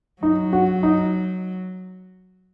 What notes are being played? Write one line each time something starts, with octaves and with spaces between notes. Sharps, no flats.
F#3 D#4
F#4
D#4